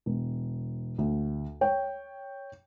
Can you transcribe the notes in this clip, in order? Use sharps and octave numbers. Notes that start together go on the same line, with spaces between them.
E1
D2
C#5 G5